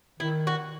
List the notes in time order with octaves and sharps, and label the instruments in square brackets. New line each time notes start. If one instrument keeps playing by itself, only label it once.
[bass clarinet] D#3 [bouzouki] E4
[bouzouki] F#4